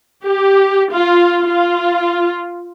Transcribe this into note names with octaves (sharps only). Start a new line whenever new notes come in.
G4
F4
F4